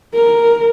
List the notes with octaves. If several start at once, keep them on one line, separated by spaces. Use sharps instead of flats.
A#4